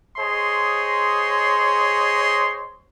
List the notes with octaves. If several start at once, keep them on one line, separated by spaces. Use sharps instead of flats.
G#4 C5 C#5 D#5 C6